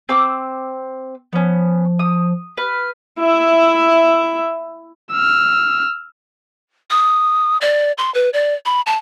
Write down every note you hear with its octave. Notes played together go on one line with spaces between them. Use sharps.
C4 D6 E6
F3 B3 C#4
D#6
B4 F6
E4 E5
E6 F6
D#6
D5
C6
B4
D5
B5
A5